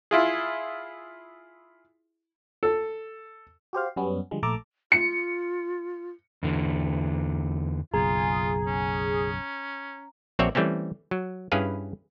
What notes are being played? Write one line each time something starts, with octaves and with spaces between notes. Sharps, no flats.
E4 F4 G#4
A4
F#4 G4 C5 F5
F#2 G3 B3 C#4
D3 F3 G3 G#3
A#1 A3 A4 A5 A#5 D6
F4 C#7
E2 D3
F#1 B1 F4 G#4 A#5
C#4
A#1 C4 F#4 C#5 D5 E5
E3 G3 A3 C4 C#4
F#3
G2 C#4 E4 G#4 B4 F5